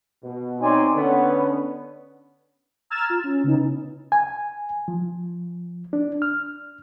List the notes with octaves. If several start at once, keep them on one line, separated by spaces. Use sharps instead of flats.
B2
C4 D#4 C#5 D5 G#5 C6
D3 B3 C#4
A#5 E6 F6 G#6 A6 E7
F4
C#4
C#3 B3 D#4
G#5
F3
D4
F6